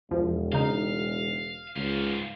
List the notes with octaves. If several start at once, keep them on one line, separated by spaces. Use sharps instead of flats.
E1 E2 F3
C#3 D#4 F5
C#2 G#2 F5